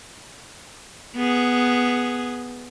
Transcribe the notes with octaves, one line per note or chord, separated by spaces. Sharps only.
B3 G#4